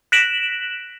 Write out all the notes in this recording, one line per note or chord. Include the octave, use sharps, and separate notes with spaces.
F#6 A#6 B6 D7 E7 F#7